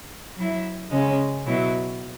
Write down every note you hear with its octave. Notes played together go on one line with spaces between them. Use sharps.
F#3
E4
C#3 G#3 C#4
B2 F#3 E4